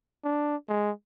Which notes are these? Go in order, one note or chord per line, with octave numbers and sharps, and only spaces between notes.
D4
G#3